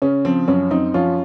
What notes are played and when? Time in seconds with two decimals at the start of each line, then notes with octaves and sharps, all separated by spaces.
0.02 C#3 C#4
0.25 F3 C4
0.48 F#2 C#4
0.71 F#2 C4 D#4
0.94 F3 C#4 F4